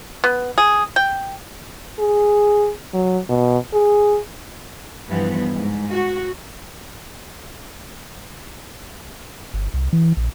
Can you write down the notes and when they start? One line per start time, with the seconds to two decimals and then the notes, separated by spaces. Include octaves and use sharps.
0.24 B3
0.58 G#4
0.96 G5
1.99 G#4
2.94 F#3
3.29 B2
3.74 G#4
5.08 G2 E3 F3 B3
5.52 G#2
5.91 F#4
9.54 G1
9.74 C2
9.93 E3
10.17 A#1